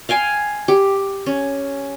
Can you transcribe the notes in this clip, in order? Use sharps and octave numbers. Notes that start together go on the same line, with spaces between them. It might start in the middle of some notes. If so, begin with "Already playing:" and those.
F5 G5 G#5 C6
G4
C#4